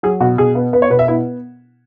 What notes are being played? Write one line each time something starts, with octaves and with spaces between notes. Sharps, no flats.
F#3 G#4
B2 F#4
B2 G#4
B3
B3 B4
C#5
B2 B4
E5
B3 E4